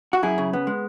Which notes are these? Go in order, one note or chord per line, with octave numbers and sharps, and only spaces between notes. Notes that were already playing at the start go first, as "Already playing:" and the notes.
F#4
F#2 E4 G#4
C#3
B3
G#3